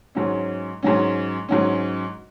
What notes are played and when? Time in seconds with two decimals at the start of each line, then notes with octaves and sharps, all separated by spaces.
0.15 G#2 F#3 C#4
0.83 G#2 F#3 C#4
1.49 G#2 F#3 C#4